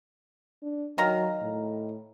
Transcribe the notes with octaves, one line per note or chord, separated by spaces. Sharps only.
D4
D#3 F#3 F5 A#5
A2